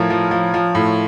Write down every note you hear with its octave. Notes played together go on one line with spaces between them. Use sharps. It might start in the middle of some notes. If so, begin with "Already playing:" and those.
Already playing: A2 F3 A#4 C#5
F3
F3
F3
A2